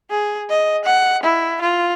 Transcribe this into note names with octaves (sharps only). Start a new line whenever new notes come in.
G#4
D#5
F#5
E4
F4